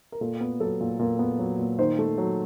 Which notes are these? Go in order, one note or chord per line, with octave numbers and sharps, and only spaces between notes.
A#4
A#2 A4
B3
F#3 A4
A#2
A#2 A#4
B3
F#3
A#2
D#3 C5
A3
F#3